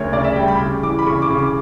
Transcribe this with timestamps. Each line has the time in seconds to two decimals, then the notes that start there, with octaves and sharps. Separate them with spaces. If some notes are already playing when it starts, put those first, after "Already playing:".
Already playing: D2 C#3 A#4 C#5
0.13 C#3 D5
0.24 E5
0.36 G3 G5
0.48 B5
0.60 C#3
0.83 E3 D6
0.99 B5
1.07 C#3 C#6
1.22 D6
1.30 C#3
1.39 D6